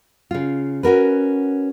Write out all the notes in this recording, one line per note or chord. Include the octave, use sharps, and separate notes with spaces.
C#3 F4
C#4 F#4 A#4 B4